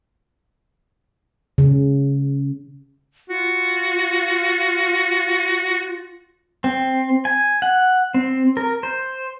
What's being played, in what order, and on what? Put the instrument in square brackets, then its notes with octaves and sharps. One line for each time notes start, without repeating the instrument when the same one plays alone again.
[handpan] C#3
[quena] F4 [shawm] F#4
[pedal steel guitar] C4
G#5
F#5
C4
A#4
C5